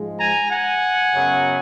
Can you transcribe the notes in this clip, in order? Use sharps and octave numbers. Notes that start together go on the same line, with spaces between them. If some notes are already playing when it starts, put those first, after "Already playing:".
Already playing: G#2 F3 G#3
G#5 A#5
F#5 G#5
F#2 C#3 F#3 B3